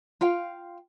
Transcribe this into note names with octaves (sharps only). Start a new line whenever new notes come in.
F4 F5 G5